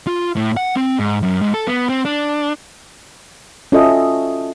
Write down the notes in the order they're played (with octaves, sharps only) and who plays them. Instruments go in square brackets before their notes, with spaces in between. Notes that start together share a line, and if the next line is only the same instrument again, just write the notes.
[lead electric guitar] F4
A2
F#5
C4
G#2
F#2
G#2
A4
B3
C4
D4
[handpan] C#4 F4 F#4 A4 D#5 E5